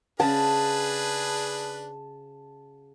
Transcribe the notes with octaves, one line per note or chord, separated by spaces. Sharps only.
C#3 D4 G#4 B4 A5